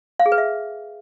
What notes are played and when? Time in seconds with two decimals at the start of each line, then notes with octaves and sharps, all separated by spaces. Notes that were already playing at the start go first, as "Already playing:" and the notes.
0.20 F5
0.26 G#4
0.32 B4
0.38 E5